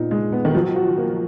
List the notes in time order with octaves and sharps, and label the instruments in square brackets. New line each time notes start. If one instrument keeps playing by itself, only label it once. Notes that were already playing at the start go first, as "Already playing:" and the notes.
Already playing: [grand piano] A#2 B3 D#4
G#3
B3
[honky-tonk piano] D#3
[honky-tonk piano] F3 [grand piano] F#3
[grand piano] F#4
A#3